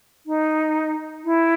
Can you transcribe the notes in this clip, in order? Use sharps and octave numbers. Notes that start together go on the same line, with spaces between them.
D#4
E4